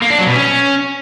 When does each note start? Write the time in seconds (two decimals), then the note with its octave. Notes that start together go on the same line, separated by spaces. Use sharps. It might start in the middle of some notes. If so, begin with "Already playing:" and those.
0.02 A#3
0.10 D4
0.18 F#3
0.27 B2
0.35 C#4